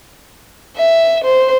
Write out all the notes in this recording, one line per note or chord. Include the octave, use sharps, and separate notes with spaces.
E5
C5